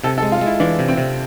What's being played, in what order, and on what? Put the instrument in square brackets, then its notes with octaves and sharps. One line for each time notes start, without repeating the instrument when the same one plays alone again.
[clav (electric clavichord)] C3 [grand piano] A4
[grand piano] A4
[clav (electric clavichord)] G#3
[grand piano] F4
[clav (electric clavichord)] G#3 [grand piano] E4
[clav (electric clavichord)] E3 [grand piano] D4
[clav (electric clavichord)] C3
[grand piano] C4
[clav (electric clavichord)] C3